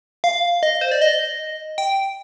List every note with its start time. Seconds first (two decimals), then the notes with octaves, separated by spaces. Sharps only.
0.24 F5
0.63 D#5
0.81 C5
0.91 D5
1.02 D#5
1.78 G5